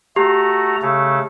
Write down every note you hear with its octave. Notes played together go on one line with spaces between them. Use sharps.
A3 F#4 G4 A#5
C#3 A3 A4